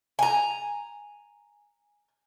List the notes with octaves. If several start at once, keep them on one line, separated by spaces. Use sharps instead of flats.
G#5 A#5